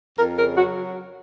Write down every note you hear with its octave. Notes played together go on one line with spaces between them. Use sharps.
F2 A#4
C#3 A#4
F#3 F#4